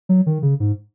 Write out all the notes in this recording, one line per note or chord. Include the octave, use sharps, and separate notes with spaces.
F#3
D#3
C#3
G#2